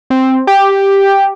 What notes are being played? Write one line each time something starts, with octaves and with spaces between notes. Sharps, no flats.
C4
G4